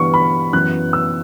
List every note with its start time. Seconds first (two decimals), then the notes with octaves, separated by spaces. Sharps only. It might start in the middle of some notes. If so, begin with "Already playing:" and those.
Already playing: G2 E3 B3 C#6
0.14 B5
0.53 F#2 E3 B3 F#6
0.93 E6